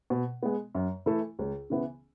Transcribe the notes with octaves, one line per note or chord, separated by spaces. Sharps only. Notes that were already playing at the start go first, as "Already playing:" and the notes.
B2
G#3 B3
F#2
E3 A3 E4 A4
C#2
C#3 E3 B3